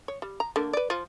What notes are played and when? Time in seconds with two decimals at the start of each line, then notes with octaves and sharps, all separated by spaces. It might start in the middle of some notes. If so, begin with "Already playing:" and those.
0.08 C#5
0.22 G3
0.40 A#5
0.56 D3 A3 A#3
0.73 B4 D5
0.90 F3 F4